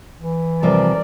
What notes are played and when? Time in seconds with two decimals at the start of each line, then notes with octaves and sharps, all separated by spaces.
0.21 E3
0.62 C3 F3 G3 A#4 D5